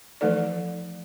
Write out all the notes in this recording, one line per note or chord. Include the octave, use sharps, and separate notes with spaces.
E3 F3 A3 D#4 A4 D5